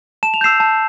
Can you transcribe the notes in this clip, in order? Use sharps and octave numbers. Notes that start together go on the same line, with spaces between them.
A5 E7
F7
E6 G6 C7 E7
A5